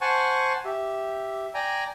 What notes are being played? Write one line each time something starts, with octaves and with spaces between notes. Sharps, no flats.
C5 F#5 G#5 A5 C#6
G4 E5
D5 G5 G#5 A#5